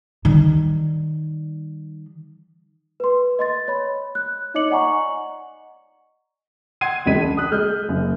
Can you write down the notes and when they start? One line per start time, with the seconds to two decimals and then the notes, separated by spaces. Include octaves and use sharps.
0.25 D#3 G3
3.00 B4 C6
3.39 D#5 C6 A6
3.68 C#5 B5
4.15 F#6
4.54 D#4 C#5 D#5 D6 C#7 F#7
4.70 D5 D#5 F#5 G#5 A#5 C#6
6.81 F#5 C6 G#6 C7 D#7
7.06 E1 C#2 D4 D#5 B6 D#7
7.19 D4
7.37 D#6 F#6
7.51 G#3 F6 G6
7.88 F#1